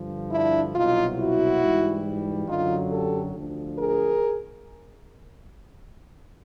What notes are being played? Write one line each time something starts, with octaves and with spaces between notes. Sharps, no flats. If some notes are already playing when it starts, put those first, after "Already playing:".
Already playing: G2 D3 F3
D4 E4
C2 B2 F#3 D#4 F4
E4 F#4
G#2 E3 G3
F#2 D3 F#3 D#4 F4
G4 A4
D2 D3 F3
G#4 A#4